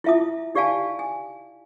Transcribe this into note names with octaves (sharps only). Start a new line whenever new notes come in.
E4 F4 E5 A5 D#6
D#4 G4 D5 F5 G#5 A5
G#5